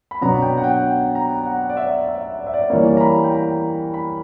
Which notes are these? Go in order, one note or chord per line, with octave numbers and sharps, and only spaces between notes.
B5
B2 F#3 B3 D4 A#5
G5
F#5
G5
A#5
F#5
D5
E5
E5
D5
E5
D5
E3 G3 A#3 C#5
A#5
B5
G5
A#5
B5